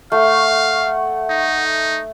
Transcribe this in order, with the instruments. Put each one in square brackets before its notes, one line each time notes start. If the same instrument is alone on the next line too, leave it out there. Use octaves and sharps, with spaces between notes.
[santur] A3 [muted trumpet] F5 [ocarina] F#5
[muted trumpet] D#4